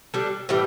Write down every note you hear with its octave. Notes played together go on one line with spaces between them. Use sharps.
G3 D4 A4
A2 E3 G3